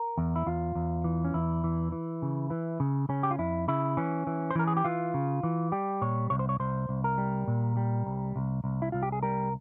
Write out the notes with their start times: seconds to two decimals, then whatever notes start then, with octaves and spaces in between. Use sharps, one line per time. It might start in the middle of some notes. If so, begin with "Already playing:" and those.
Already playing: A#4
0.18 E2
0.36 E4
0.46 E2 F4
0.75 E2
1.04 E3
1.25 C#4
1.34 E2 E4
1.64 E3
1.92 E3
2.22 C#3
2.50 E3
2.80 C#3
3.09 C#3 C#4
3.23 G4
3.31 F4
3.38 F2 E4
3.68 C#3 E4
3.97 E3 C#4
4.27 E3
4.51 C5
4.55 E3 A#4
4.67 G#4
4.77 G4
4.84 E3 F4
5.14 C#3
5.43 E3
5.72 G3 G4
6.01 A#2 C#5
6.30 C2 C#5
6.39 C5
6.49 C#5
6.60 C2 C5
6.89 C2
7.04 A#4
7.18 G3
7.48 A#2
7.77 G3
8.07 C2
8.36 C2
8.64 C2
8.82 E4
8.92 C2 F4
9.03 G4
9.12 G#4
9.23 G3 A#4